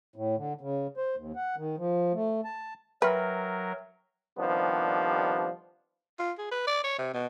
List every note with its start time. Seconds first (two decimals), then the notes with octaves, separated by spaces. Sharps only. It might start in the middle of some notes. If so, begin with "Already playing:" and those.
0.16 A2
0.37 D3
0.61 C#3
0.97 C5
1.16 D#2
1.36 F#5
1.56 D#3
1.78 F3
2.14 A3
2.45 A5
3.02 F#3 A#4 B4 E5 G5 F6
4.37 C3 D#3 F3 G3 B3 D4
6.19 F4
6.38 G#4
6.51 B4
6.67 D5
6.84 C#5
6.98 C3
7.14 B2